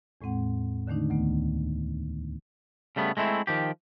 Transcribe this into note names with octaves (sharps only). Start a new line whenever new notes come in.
E2 A2 G#3 C4 F#5
D3 D#3 A3 D4 D#4
D2 D#3 A3 B3
C#3 G3 A3 B3
G#3 A3 C4 E4
D#3 F3 G4